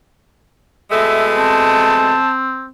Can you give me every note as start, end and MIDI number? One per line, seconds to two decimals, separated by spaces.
0.91 2.16 47
0.91 2.16 56
0.91 2.16 57
0.91 1.30 76
1.38 2.70 60
1.38 2.28 81